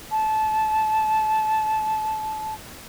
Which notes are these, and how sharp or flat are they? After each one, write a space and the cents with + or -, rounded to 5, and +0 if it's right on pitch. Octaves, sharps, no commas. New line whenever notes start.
A5 -20